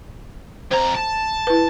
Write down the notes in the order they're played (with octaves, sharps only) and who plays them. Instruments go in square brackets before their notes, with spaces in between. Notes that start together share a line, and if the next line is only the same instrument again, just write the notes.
[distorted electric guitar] F2 A#5 [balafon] C5
[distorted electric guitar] A5
[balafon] E4 B4